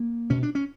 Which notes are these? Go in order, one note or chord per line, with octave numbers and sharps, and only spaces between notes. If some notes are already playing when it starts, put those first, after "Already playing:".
Already playing: A#3
B2 C#4
D4
C#4